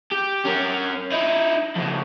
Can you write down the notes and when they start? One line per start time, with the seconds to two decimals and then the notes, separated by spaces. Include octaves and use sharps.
0.11 G4
0.45 C#4 A#4
1.12 D#4 E4
1.76 F2 C#3